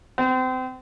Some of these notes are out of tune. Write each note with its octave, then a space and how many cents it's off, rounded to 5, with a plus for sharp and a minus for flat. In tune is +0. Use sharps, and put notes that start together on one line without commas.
C4 -30